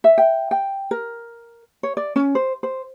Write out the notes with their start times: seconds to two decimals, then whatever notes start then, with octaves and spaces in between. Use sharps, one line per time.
0.04 E5
0.18 G5
0.51 G5
0.91 A#4
1.83 C#5
1.97 D5
2.16 C#4
2.35 C5
2.63 C5